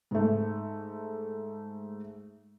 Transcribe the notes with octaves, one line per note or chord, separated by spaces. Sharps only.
G#2 A3